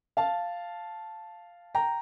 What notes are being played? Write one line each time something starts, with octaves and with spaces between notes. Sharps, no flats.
F5 A5
G5 A#5